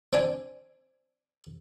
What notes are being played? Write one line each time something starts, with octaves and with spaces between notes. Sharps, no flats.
C4 D4 G#5